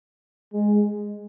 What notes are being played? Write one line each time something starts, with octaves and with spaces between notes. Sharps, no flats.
G#3